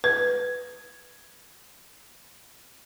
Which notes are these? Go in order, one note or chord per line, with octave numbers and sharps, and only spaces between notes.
B4 G#6